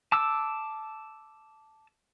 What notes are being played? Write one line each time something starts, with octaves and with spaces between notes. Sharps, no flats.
A5 D6 E6